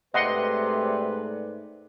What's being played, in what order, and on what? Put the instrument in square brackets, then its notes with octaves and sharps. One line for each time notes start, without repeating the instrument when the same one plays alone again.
[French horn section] G#2 A3 D5 [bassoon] C3 [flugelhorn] B4 [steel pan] D#5 F#5 C6